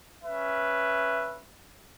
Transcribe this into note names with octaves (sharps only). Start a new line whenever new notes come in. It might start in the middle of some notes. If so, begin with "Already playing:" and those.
C#4 B4 E5